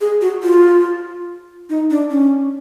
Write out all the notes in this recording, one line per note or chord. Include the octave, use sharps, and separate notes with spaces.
G#4
F#4
F4
D#4
D4
C#4